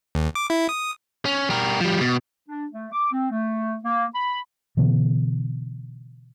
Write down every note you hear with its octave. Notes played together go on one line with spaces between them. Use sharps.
D#2
D6
E4
D#6
C#4
G3 A#4
F3 G3
B2
D4
A3
D6
C4
A3
A#3
B5
B2 D3 E3 B3